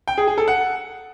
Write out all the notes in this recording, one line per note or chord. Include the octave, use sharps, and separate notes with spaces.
G5
G#4
G#4
A4
F#5